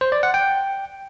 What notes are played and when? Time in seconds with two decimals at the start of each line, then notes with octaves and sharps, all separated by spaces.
0.01 C5
0.12 D5
0.23 F#5
0.34 G5